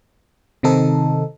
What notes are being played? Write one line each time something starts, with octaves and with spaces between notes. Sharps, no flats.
C3 D#3 C4 D#4 A4